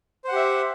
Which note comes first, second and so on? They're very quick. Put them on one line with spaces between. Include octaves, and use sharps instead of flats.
C5 F#5 G4 E5